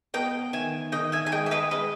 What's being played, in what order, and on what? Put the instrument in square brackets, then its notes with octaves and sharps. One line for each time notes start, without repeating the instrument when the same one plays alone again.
[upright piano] B3 [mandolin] D#5 G5
[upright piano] D#3 [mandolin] E5 G#5
[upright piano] D#3 [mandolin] D#5 G5
[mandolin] E5 G#5
G#5
[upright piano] G#3 [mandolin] D#5 G5
[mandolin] E5
B4 D#5
[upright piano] G#3 [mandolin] B4 D#5